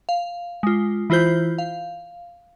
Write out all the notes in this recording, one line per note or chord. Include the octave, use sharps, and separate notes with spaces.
F5
G#3 F4
E3 E4 F4 C5 G6
F5